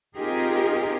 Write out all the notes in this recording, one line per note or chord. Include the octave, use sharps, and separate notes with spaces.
C4 D#4 F4 G4 G#4 A#4